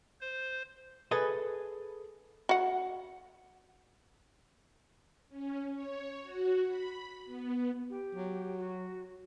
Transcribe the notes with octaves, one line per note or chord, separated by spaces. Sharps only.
C5
G#4 A4 B4 D#5
F#4 F#5
C#4
C#5
F#4
B5
B3
G4
F#3
F#4